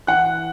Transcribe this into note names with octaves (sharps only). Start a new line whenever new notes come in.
E3 F#5 F#6